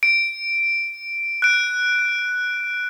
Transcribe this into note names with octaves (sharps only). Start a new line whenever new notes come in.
D7
F#6 D7